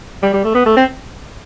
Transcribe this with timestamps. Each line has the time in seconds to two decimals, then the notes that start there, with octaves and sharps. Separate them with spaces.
0.23 G3
0.33 G3
0.44 A3
0.55 B3
0.66 A3
0.77 C4